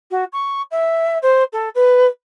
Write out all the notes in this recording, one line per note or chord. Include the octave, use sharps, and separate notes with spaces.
F#4
C#6
E5
C5
A4
B4